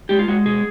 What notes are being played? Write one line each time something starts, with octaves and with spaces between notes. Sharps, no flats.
G#3 G4
F4
G#3 F#4
B2 G#4